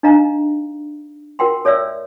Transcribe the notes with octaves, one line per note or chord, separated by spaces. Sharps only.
D4 D#4 D#5 F5 A#5
F4 A#4 F#5 G5 C6
A4 C#5 D5 E5 E6